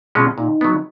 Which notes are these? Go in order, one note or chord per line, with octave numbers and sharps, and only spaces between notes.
B2 G#3 C#4 F4
A#2 D#4
F#3 B3